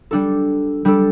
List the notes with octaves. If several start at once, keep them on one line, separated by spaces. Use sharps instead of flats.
G3 D4 A4
G3 D4 A4